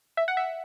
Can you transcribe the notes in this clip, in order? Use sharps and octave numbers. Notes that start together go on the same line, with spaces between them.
E5
F#5
E5